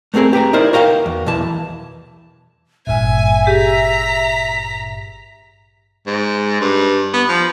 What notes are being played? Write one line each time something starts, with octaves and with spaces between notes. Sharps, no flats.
A3 A#3 C4 G#4 A#4
G4 B4 G5 A#5
D#4 E4 A#4 C5 D5
F#4 A#4 F5 G5
E2
B1 E2 E3 A5
G#1 G2 A#2 E5 G#5
G4 G#4 A#5 B6
G#2
G2
B3
F3